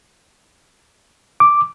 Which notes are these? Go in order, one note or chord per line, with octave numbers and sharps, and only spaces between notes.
D6